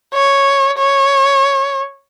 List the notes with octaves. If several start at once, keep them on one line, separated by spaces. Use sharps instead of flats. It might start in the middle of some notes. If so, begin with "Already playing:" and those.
C#5
C#5